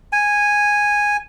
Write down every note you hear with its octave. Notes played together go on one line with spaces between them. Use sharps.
G#5